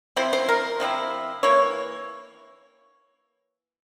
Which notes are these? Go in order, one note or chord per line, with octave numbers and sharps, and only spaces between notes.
F3 C4 E4 C5
C5
A#4
C3 F3 C4 E4
E3 A#3 E4 C#5